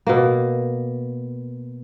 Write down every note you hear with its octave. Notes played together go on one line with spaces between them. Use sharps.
B2 A#3